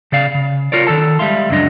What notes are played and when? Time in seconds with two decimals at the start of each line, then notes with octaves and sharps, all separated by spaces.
0.12 C#3 D5 F5
0.35 C#3
0.72 F4 A#4 C#5 D5
0.87 D#3 F#3 A4 A5
1.19 G3 G#3 E5 F5 C6
1.49 C#2 F#2 F#3 D4 D#5